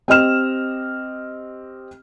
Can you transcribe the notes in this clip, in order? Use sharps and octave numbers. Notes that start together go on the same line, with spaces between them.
C4 G4 D#5 F6 E7